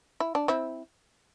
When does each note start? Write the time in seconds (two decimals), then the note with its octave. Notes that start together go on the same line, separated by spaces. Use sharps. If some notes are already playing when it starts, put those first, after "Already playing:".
0.20 E4
0.35 D4
0.48 C4 E4